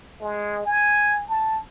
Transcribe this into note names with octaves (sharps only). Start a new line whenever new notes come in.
G#3
G#5
A5